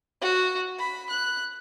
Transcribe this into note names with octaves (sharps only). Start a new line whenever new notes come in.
F#4
B5
F#6